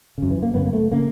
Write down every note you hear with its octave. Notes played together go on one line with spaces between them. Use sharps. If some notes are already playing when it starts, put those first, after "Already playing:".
F#2 C#3
E3
A#3
F#2 C#3 B3
A#3
A3
C#3 A#3